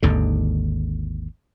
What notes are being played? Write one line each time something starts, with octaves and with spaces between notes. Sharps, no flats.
G#1 D#2 D3